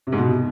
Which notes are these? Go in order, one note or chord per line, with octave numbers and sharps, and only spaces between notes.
C3
G#2
B2